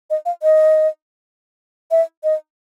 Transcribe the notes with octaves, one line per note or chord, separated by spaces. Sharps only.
D#5
F5
D#5
E5
D#5